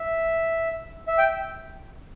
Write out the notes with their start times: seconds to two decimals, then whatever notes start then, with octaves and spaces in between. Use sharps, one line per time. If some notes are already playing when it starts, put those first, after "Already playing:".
Already playing: E5
1.08 E5
1.18 G5